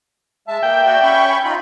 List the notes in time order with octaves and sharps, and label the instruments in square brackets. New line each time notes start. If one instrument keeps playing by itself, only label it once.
[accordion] G#3 A5 [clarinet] E5
[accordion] A#3 [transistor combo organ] G5
[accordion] F#4 D5
C#4 B5 C#6
D#4 F4 B5